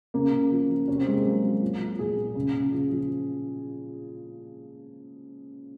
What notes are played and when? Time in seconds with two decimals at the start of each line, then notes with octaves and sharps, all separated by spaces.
0.14 C#3 A#3
0.33 C#3
0.52 F3
0.69 F3
0.88 C3 C#4
0.98 C4
1.07 C3 G#3
1.15 A#3
1.25 F#3 A#3
1.44 F#3
1.61 F3
1.80 F3
1.99 A#2 G#4
2.17 A#2
2.35 C#3
2.54 C#3
2.72 F3
2.92 F3